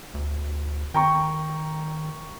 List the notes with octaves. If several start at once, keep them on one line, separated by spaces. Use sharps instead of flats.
D2
D#3 G5 A#5 C#6